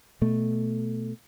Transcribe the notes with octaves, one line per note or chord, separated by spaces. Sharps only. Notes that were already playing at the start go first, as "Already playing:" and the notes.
B2 A3